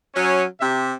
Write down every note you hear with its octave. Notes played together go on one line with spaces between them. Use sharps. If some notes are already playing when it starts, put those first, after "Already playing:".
F#3 C#4
C3 E5